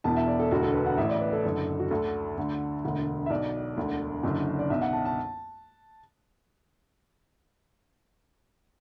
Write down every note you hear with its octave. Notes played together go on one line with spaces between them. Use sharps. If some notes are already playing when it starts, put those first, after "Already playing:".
E1 E2 B2 A5
E5
D5
A4
E1 D2 D3 F#4
A4
B4
F#5
A1 A2 E3 E5
D5
B4
A4
F#1 F#2 D3
F#4
D2 D3 A4
D2 D3
E1 D2 D3
E5
B1 B2 D5
E1 D2 D3
F#1 F#2 D3
D5
B1 B2 E5
F#5
A5
A5